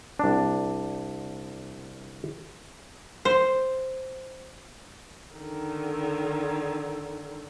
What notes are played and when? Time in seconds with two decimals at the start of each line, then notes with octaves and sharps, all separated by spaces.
0.19 C2 D4
3.25 C5
5.36 D3 D#3